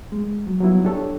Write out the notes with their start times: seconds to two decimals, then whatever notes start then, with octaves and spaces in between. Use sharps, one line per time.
0.12 G#3
0.47 F#3
0.61 F#3 G3 B3 E4 F4
0.84 D4 G4 A4 C#5